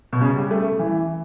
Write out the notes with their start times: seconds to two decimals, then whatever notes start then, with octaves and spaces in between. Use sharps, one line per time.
0.13 B2
0.21 C#3
0.36 G3
0.51 A3
0.79 E3